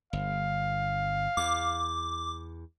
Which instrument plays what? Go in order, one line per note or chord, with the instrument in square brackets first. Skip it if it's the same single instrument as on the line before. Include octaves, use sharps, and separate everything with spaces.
[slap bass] G1 [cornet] F5
[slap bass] E2 [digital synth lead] D6